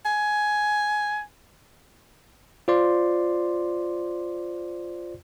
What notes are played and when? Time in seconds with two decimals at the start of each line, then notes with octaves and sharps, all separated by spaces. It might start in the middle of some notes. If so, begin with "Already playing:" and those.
0.05 G#5
2.68 F4 C5 D5 C6